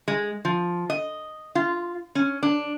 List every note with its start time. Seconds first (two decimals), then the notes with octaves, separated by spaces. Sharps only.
0.08 G#3
0.45 F3
0.90 D#5
1.55 F4
2.15 C#4
2.43 D4